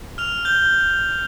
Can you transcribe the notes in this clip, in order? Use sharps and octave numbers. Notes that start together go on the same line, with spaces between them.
F6 F7
G6 G7